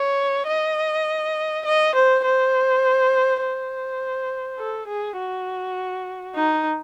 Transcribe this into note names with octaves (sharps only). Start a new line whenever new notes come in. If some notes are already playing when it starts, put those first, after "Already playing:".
Already playing: C#5
D#5
D#5
C5
C5
C5
A4
G#4
F#4
D#4